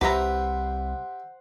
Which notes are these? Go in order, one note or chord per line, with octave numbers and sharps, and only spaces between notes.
C2 G4 B4 C5 E5 F#5 A#5